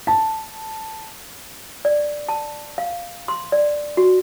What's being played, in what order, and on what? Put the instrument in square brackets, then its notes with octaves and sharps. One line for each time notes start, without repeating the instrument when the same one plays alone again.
[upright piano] A5
[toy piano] D5
A5
F5
C6
D5
F#4